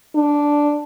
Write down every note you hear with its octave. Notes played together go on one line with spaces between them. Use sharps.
D4